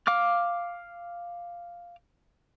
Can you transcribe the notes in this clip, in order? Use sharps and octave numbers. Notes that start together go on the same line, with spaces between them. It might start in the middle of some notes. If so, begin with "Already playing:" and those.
F5 D6 F6